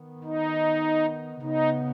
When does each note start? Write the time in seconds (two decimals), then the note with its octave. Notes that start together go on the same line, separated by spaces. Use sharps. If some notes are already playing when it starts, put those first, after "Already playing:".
Already playing: D#3 B3
0.24 D#4
1.41 C#3 B3 D#4